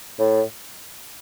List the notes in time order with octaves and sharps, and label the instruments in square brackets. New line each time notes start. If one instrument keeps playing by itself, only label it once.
[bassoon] A2